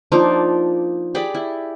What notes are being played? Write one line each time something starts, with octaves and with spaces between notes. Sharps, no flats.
F3 A#3 D4 D#4
G4 G#4 D5 B5
E4